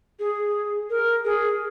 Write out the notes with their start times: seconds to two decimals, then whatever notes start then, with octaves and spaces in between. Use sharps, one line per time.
0.19 G#4
0.90 A#4
1.25 G#4